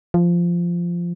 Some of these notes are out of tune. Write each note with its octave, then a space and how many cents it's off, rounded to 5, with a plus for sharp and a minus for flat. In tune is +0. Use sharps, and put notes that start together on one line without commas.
F3 -10